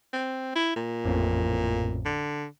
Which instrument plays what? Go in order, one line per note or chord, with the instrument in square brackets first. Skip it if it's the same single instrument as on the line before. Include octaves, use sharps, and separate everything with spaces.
[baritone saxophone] C4
E4
A#2
[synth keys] A1 F2 A2
[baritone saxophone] D3